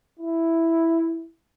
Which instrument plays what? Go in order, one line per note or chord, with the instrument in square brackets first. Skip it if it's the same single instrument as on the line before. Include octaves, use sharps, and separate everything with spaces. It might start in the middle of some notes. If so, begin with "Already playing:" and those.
[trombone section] E4